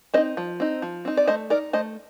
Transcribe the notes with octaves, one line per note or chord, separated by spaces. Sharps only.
C4 D#4 C5 D#5
F3
C4 D#4
F3
C4 D#4
D5
A3 C5 D#5
D#4 A#4 D5
A3 C5 D#5